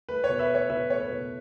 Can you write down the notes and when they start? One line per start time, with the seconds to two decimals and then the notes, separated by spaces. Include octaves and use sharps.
0.09 A3 B4
0.24 C#5
0.29 B2
0.39 B4 E5
0.50 A3
0.55 C#5
0.70 B2 B4 E5
0.90 A3 C#5
1.00 B4
1.10 B2